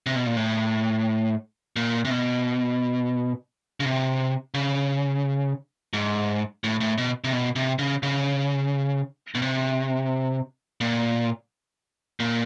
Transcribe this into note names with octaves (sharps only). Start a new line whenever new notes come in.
C3
B2
A#2
A2
A#2
C3
B2
C#3
C3
C#3
G#2
A2
A2
B2
C3
B2
C3
C#3
C#3
B2
C3
A#2
A#2